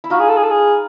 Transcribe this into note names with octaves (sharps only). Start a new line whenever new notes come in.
E4
D#4 F4 F#4
G#4
A4
G#4
A4
G#4